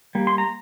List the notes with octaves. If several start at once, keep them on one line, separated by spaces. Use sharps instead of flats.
G3 A#3
C6
A#5